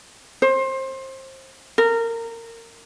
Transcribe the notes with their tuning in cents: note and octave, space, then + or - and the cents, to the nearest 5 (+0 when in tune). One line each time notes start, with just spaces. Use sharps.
C5 +25
A#4 -20